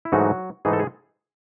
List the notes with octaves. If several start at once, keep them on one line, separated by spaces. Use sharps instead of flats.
E4
G#2 E3 F#3 A3 D#4 F#4
G#2 E3 A3 D#4 G#4
A4
G#4